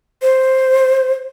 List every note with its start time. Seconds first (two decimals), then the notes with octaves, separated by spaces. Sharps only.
0.22 C5